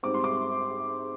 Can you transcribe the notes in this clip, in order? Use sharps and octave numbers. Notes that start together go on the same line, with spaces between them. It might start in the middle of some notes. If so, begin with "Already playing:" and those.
G#2 G3 C4 D6
C6
D6